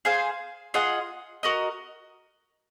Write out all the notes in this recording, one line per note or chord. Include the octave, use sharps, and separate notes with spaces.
G#4 C5 F5 G#5
F4 G#4 D#5 F#5
F#4 A#4 D#5